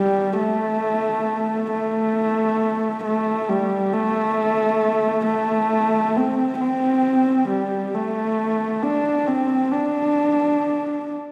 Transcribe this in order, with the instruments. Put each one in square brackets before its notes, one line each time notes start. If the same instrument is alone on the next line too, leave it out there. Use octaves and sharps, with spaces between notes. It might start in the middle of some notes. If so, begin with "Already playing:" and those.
Already playing: [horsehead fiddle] G3
A3
A3
A3
G3
A3
A3
C4
C4
G3
A3
D4
C4
D4